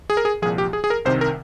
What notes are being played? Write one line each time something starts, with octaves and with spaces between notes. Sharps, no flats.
G#4
A#4
G#4
C2 A#2 F3 G#4
G4
G#4
G#4
A#4
C2 C3 D#3 C5
A#4